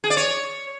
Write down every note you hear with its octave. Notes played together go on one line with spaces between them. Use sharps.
G#4
D5
C#5